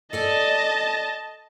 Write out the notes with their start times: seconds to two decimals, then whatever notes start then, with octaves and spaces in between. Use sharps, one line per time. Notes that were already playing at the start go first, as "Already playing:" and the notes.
0.13 A4 D5 D#5 G#5 A5